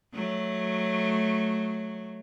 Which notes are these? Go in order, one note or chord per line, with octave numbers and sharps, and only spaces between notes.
F#3 A3